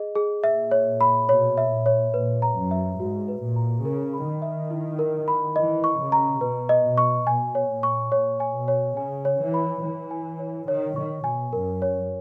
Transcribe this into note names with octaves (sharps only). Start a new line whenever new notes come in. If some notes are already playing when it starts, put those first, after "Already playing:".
Already playing: G#4 D#5
G#4
A#2 E5
C#5
B5
B2 C#5
E5
A#2
C#5
A#2 B4
A#5
F#2
E5
G#2 F#4
B4
A#2
A#5
C#3 A#4
B5
D#3
E5
E4
A#4
B5
E3 D#5
C#6
C#3
A#5
B2 B4
D#5
B2
C#6
B2 G#5
C#5
A#2
C#6
A#2 C#5
G#5
B2
C#5
C#3 G#5
C#5
E3
B5
E3 C#5
G#5
C#5
D#3 C#5
D#3 C#6
B2 G#5
F#2 A#4
C#5